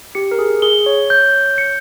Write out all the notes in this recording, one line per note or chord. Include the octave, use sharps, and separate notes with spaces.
G4 C#7
A#4
G#4
G#4 G7
C#5
G6
C#7